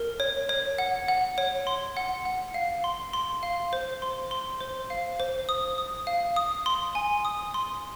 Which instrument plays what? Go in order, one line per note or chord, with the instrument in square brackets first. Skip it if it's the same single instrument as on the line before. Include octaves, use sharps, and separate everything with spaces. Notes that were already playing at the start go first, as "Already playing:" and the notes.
Already playing: [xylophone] A#4
C#5
C#5
F#5
F#5
C#5
C6
F#5
F#5
F5
C6
C6
F5
C5
C6
C6
C5
F5
C5
D#6
D#6
F5
D#6
C6
G#5
D#6
C6